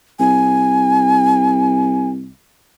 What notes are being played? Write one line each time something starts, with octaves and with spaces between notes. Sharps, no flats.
C2 G#5